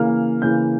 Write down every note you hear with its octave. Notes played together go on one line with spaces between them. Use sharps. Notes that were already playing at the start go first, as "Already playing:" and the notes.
Already playing: C#3 E3 A#3 F6
C#3 E3 A#3 G6